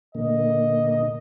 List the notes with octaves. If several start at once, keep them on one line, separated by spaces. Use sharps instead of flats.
A#2 D3 A#3 D#5